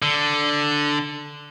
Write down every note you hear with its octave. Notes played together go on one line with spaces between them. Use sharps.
D3